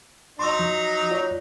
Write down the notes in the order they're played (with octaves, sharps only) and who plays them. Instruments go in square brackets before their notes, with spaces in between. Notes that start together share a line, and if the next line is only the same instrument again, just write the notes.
[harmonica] F#3 D#4 [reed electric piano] C6 C#6 E6
[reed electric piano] F3
F4 C#5 D5